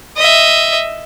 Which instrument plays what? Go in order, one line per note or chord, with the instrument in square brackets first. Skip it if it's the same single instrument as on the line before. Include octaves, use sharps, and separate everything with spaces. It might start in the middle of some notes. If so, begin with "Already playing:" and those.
[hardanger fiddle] D#5 E5